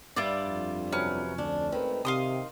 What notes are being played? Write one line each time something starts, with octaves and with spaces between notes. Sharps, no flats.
G2 G3 E4 F4 D5
F2
C3 F#3 C#4 B4
D2 D4
G#1 D#3 A3 C4 B4
C3 F5 C6 D#6